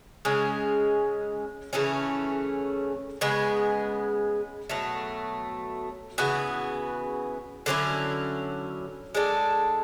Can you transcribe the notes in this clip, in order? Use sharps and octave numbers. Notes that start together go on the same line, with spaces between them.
C#3 G#3 C#4
C#3 E3 A3 C#4
C#3 G#3 B3
B2 F#3 A3
C#3 E3 B3 F#4
D3 F#3 C#4 E4
G#3 D4 A4